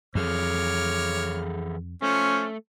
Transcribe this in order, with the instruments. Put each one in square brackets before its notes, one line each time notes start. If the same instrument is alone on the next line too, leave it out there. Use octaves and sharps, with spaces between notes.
[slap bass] F2 [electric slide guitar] E3 G#4 A4 [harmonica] C#5 D6 F6
[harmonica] F3 C5 [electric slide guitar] A3 [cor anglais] C#4